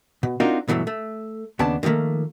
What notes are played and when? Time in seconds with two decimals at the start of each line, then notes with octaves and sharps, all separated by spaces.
0.23 B2
0.40 C4 D4 D#4 F4 F#4 A#4
0.68 G2 B2 E3 F#3 A3
0.87 A3
1.59 D#2 C#3 B3 D4 A5
1.83 D3 D#3 F3 A3 A#3